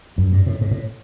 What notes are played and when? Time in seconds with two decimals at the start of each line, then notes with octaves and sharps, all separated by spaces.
0.18 F#2
0.32 G2
0.46 A2
0.61 G#2
0.71 A2